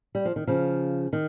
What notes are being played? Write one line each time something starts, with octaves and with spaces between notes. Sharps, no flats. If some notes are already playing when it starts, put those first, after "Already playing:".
G3
F3
D#3
C#3 F3
D#3